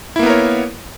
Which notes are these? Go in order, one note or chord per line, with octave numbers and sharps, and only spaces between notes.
A#3 B3 E4 A#4 C#5